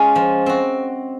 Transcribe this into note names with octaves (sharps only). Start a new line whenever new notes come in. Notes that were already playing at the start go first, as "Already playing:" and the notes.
Already playing: G#3 C#4 F4
F3
C4 F#4